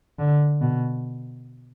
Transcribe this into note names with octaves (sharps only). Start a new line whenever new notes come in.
D3
B2